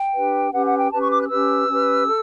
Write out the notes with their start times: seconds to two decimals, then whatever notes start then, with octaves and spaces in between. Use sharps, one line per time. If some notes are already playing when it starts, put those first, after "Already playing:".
Already playing: G5
0.14 D4 G4 B4
0.53 C#4 G4 B4 F#5
0.66 F#5
0.78 G5
0.92 C#4 G4 B4 A5
1.02 C#6
1.11 D6
1.21 F#6
1.29 C#4 G4 B4 E6
1.69 C#4 G4 B4
2.07 A4